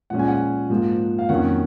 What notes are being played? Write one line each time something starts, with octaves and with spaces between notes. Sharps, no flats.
A#2 F3 G#3 C#4 F#5
G#5
F#5
G#2 F3 A#3
F5
F2 D#3 F#3 A#3 C#4 F#5